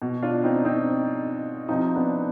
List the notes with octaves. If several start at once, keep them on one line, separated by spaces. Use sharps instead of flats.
B2
D4 F4
C4 D#4
C4 D#4
C3 F3 C4 D#4
B3 D4